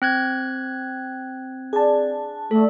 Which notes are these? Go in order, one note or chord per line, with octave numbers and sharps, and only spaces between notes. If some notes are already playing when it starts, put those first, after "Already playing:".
C4 F#6 G#6
D4 G#4 A5
A3 F#4 A4 D5